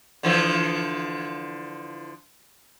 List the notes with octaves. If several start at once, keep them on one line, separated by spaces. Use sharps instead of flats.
D3 E3 F3